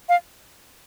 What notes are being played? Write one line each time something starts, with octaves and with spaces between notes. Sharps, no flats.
F5